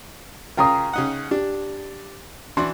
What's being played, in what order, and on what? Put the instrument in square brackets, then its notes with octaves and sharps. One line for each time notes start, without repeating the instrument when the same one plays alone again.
[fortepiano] C#3 F4 A#4 [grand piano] G5 A#5 D#6
[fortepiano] C#3 D#4 F#5
[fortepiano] D4 [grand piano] G4
[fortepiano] E3 D4 F#4 [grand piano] C6